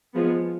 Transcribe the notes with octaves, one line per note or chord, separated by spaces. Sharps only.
F3 G#3 B3